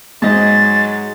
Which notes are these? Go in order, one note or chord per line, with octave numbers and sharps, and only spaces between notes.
G#2 F#3 G#3 D#5 A6